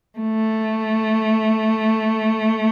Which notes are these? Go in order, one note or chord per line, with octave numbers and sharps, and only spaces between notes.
A3